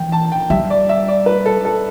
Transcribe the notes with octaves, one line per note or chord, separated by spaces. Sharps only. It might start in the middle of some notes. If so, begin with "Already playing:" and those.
Already playing: E3 G5
A5
G5
G3 E5
D5
E5
D5
B4
A4
A4